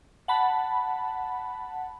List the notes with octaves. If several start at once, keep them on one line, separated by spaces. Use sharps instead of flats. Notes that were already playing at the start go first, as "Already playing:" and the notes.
F#5 A5 B5